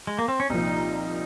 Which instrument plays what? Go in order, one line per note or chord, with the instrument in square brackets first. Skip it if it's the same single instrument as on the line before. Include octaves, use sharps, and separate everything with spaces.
[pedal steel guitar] G#3
A#3
C4
C#4
[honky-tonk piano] C2 A#2 F3 [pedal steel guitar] D#4